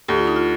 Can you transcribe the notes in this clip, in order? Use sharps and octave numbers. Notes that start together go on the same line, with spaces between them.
D2 G4
F4
D#4
F4